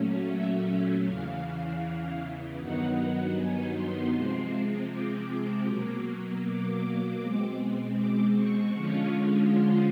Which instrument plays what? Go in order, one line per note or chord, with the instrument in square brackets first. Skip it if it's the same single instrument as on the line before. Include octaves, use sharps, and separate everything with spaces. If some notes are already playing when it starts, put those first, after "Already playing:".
Already playing: [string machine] A#2 F#3 A3 C#4
E5
E2 C#3 E3 F5
G2 D#3 F#3 B3 D#4 F#5
F#5
G#5
C6
C3 F3 G#3 C4
D6
B2 F#3 A#3
D6
B2 G#3 C4
D6
C#6
D3 F3 G#3 C#4 F4
C6